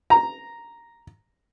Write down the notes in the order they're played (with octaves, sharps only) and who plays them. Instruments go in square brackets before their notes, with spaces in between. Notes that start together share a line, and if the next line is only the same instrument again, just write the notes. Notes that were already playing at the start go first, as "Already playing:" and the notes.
[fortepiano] A#5